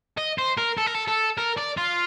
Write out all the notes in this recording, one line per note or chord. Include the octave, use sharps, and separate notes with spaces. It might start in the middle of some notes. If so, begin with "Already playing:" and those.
D#5
C5
A#4
A4
A#4
A4
A4
A#4
D5
F4